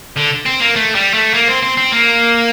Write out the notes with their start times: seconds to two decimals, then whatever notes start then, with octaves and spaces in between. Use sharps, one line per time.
0.17 D3
0.46 C4
0.61 A#3
0.76 A3
0.95 G3
1.14 A3
1.34 A#3
1.48 C4
1.62 C4
1.77 C4
1.92 A#3